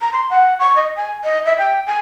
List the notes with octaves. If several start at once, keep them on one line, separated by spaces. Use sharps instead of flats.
A#5
C6
F#5
C#6
D#5
G#5
D#5
E5
G5
G#5